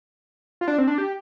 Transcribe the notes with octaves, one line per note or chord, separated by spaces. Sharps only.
F4
D4
C4
D4
G4